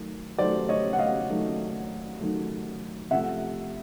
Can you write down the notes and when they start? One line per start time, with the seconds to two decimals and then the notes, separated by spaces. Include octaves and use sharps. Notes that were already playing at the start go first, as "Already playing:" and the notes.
Already playing: D#3 F#3 A3
0.38 D#3 F#3 A3 C5 D5
0.69 C#5 D#5
0.93 F#5
0.99 D#5 F5
1.29 D#3 F#3 A3
2.20 D#3 F#3 A3
3.11 C3 F3 A3 E5 F#5